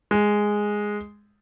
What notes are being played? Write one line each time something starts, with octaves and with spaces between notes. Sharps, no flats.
G#3